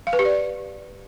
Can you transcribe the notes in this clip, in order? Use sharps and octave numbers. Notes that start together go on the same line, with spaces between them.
F5
B4
G4
D5